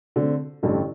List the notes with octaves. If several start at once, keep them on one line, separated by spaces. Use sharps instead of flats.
D3 A3 C4
A1 G2 D3 A3